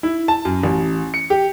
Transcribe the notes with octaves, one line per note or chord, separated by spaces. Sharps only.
E4
A5
F#2
A1
C#7
G4